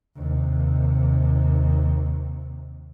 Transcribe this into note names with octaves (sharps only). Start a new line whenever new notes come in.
D#2 C3